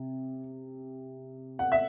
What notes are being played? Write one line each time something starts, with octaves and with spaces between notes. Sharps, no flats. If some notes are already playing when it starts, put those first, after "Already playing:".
Already playing: C3
F#5
E5